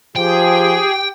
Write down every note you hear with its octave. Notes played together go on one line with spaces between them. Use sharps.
F3 G4 G#4 G5